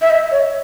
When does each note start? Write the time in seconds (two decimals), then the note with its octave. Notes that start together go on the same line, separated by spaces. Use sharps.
0.02 E5
0.10 D#5
0.31 C#5